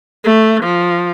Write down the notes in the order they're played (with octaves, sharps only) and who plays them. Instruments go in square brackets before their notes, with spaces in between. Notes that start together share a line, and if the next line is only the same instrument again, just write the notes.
[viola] A3
F3